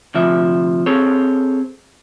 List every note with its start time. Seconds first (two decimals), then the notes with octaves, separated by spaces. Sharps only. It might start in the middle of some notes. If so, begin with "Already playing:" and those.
0.14 D2 C3 F3 E5
0.86 C4 G#4 A4 C#5